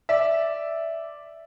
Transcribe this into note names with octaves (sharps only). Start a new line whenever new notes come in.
D5 E5